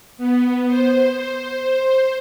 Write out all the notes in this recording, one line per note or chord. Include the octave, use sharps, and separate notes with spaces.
B3
C5